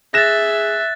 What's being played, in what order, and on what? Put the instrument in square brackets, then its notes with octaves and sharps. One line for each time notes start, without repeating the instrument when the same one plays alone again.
[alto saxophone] G#4 [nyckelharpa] E5 [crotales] F#6 A6 [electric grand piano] A#6 E7